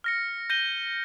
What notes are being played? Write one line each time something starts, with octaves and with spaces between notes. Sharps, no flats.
F6 A#6 C#7
G6 A#6 D#7 G7